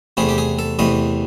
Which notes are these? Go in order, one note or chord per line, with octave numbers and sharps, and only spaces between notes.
E2 C3 E3 A3 G#4
G4
G#4
A4
E2 C3 E3 A3 D#5